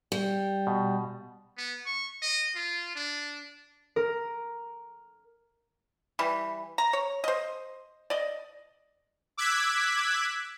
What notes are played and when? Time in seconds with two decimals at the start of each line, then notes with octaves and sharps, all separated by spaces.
0.12 G3
0.67 B2
1.58 B3
1.86 C#6
2.22 D#5
2.55 F4
2.96 D4
3.96 A#4
6.19 E3 G3
6.78 A#5
6.93 C#5
7.24 C5 D#5
8.10 D5 D#5
9.37 D6 E6 F#6 G#6 B6